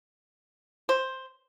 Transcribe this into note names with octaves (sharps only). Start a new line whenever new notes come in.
C5